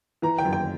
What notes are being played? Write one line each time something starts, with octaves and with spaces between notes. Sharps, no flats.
E3 A#5
G5
F#2
G5